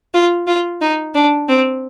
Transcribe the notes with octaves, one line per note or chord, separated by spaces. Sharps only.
F4
F4
D#4
D4
C4